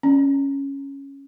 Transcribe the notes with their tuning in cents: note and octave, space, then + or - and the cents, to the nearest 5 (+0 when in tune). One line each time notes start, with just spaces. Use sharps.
C#4 -5